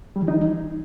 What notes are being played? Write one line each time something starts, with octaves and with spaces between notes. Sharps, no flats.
G3
E3
D#4